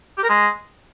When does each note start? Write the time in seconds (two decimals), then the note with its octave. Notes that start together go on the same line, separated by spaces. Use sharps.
0.17 G4
0.23 A#4
0.29 G#3